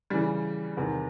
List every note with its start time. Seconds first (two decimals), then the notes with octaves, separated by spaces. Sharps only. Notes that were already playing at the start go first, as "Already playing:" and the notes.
0.10 C#3 E3 G3
0.77 E2 C3 D#3